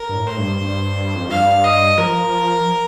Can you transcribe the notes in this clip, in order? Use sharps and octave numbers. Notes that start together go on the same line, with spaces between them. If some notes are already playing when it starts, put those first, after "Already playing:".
Already playing: A#4
G2
A2
C5
G2
G2
F2
G2 F5
D#5
F3 A#4